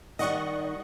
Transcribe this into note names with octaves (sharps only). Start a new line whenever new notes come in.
D#3 G3 D5 D#5 F#5 C#6